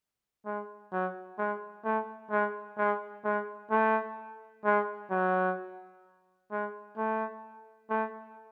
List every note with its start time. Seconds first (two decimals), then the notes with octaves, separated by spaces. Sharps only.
0.46 G#3
0.93 F#3
1.38 G#3
1.85 A3
2.31 G#3
2.78 G#3
3.24 G#3
3.71 A3
4.65 G#3
5.11 F#3
6.52 G#3
6.97 A3
7.90 A3